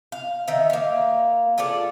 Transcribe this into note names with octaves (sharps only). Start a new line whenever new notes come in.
F5
D#3 D#4 E5
A#3 F5
F4 G#4 A4 D5